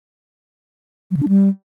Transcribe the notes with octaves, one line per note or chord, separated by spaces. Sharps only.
F#3
C#3
D4
G3